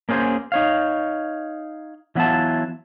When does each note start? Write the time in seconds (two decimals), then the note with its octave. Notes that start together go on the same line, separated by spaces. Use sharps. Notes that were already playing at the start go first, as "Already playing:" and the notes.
0.09 A#3 C#4 G#4 C5
0.52 D#4 C#5 F5
2.15 E3 F#3 B3 E4 F4 A5